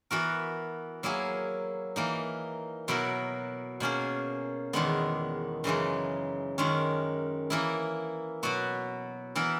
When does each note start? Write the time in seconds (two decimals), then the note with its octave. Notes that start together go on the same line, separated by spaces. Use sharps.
0.11 E3 B3 F#4 A#4
1.03 F#3 A#3 E4 G#4
1.96 E3 A#3 D#4
2.88 B2 F#3 B3 E4 A#4
3.80 B2 A#3 C#4 G#4
4.73 E2 D#3 G#3 B3 D#4
5.64 F#2 C#3 E3 G#3 D#4
6.58 F#2 D#3 G#3 C#4
7.50 E3 A#3 E4
8.43 B2 F#3 B3 F#4
9.36 E3 B3 E4 A#4